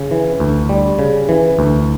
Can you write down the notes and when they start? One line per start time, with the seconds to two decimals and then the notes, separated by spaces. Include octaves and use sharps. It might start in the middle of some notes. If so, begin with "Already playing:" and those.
Already playing: C#3
0.11 E3
0.40 D2
0.69 G3
0.99 C#3
1.29 E3
1.59 D2